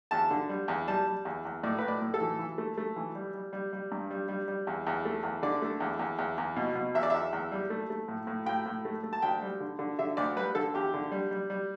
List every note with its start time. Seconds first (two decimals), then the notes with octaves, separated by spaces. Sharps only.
0.11 E2 A5
0.31 D3
0.49 G3
0.68 E2
0.88 G3 A5
1.07 G3
1.25 E2
1.45 E2
1.63 A2 D5
1.78 A2 B4
1.88 D5
2.02 A2
2.14 A4
2.21 E3
2.39 E3
2.58 A3
2.78 A3
2.96 E3
3.15 G3
3.34 G3
3.53 G3
3.73 G3
3.92 G2
4.11 G3
4.29 G3
4.48 G3
4.67 E2
4.87 E2
5.05 A3
5.23 E2
5.43 D3 D5
5.62 A3
5.80 E2
5.99 E2
6.19 E2
6.38 E2
6.56 B2
6.75 B2
6.95 E2 E5
7.03 D5
7.10 E2 E5
7.33 E2
7.52 G3
7.70 A3
7.90 A3
8.08 A2
8.27 A2
8.46 A2 G5
8.66 A2
8.85 A3
9.03 A3
9.13 A5
9.22 D2 G5
9.42 G3
9.60 D3
9.79 D3
9.99 D3 E5
10.17 D2 D5
10.36 G3 B4
10.55 D3 A4
10.74 E2 G4
10.94 D3
11.12 G3
11.31 G3
11.50 G3